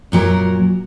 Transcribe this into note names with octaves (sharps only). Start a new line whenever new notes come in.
F#2 A#2 F#3 A#4